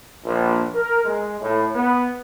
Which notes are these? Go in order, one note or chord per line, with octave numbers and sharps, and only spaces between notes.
A#1
A#4
G#3
A2
B3